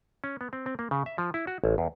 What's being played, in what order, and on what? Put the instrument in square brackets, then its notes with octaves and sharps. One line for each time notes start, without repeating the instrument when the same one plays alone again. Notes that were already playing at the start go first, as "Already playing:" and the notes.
[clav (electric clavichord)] C#4
B3
C4
C4
A#3
C#3
E5
F3
E4
F#4
A1
E2